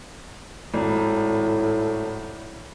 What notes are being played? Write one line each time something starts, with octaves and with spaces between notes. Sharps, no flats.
G#1 A2